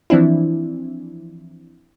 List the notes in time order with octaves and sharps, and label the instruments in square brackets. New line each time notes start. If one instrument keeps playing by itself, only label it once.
[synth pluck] E3 F3 C4 D4 E4